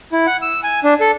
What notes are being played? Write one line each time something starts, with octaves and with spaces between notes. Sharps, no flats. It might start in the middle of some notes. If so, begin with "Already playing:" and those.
E4
F#5
E6
G#5
D4
A4